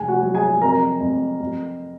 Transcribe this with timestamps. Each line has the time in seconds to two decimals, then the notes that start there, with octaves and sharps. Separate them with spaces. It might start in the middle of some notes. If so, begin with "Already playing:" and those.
Already playing: F1 G#4 G#5
0.08 F#4 F#5
0.22 F#3
0.35 G#4 G#5
0.62 F2 A#4 A#5
1.01 F2
1.40 F2